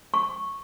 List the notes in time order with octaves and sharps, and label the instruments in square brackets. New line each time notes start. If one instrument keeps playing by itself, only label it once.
[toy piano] C#6